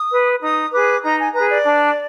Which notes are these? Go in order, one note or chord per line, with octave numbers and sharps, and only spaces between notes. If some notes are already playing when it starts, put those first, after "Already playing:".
Already playing: D#6
B4
D#4 D#6
G#4 B4 D6
D#4 A#5
G#5
G#4 B4 A#5
D5
D4